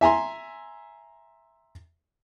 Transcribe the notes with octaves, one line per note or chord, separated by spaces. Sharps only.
E5 G#5 A#5 C6